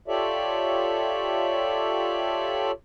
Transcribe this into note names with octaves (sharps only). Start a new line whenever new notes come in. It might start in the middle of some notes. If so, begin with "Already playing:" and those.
F4 G4 A4 C#5 D5 E5